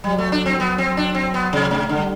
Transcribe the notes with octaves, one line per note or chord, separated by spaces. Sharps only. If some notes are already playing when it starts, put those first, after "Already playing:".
F#3 G3
A3
D4
C4
F#3 B3
C4
F#3
D4
C4
B3
C3
C3 A3
D3
G3